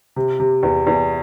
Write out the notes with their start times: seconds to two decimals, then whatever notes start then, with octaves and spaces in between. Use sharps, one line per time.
0.16 C3
0.40 C3
0.63 E2
0.87 E2